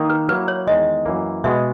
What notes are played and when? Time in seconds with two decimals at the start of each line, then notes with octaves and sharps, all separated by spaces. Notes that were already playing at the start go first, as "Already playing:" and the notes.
Already playing: D#3 A#3 D#4
0.10 B4
0.29 F#3 A#3 E4 B4
0.48 C#5
0.67 E2 D#3 G#3 D#5
1.06 F#2 E3 A#3
1.44 B2 G#3 B3 E5